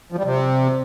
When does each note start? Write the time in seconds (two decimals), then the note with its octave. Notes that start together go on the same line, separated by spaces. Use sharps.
0.12 F3
0.18 G3
0.24 C3